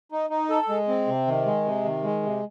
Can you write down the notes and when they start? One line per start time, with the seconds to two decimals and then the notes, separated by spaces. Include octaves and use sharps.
0.12 D#4
0.30 D#4
0.50 A4
0.69 G#3
0.88 C4
1.07 C3
1.27 D#3
1.46 G#3
1.64 C3
1.84 D#3
2.03 G#3
2.23 C3